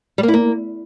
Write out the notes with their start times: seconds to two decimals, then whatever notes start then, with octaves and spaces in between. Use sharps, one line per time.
0.18 G3
0.23 A#3
0.28 E4
0.34 A#3